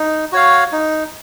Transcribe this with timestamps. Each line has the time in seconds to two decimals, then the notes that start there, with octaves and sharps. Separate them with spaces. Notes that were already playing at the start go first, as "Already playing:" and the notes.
Already playing: D#4
0.32 F#4 C#5 F5
0.72 D#4